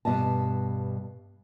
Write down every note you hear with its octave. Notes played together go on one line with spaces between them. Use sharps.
G2 B2 D#5 A5